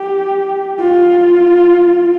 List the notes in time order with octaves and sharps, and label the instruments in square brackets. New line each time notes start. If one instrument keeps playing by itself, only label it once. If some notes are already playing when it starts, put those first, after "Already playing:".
Already playing: [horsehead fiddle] G4
F4